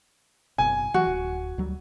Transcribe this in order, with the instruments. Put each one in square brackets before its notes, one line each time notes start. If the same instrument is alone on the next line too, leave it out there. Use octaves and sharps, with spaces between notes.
[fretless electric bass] F#1 B2 [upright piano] G#5
[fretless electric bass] E3 F#3 [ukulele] F#4
[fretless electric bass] D1
D2 F#3 G3